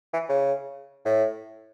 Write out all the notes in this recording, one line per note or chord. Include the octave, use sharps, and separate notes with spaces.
E3
C#3
A2